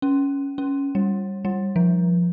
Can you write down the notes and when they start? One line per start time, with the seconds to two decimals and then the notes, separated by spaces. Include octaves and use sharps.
0.02 C#4
0.58 C#4
0.95 G3
1.45 G3
1.76 F3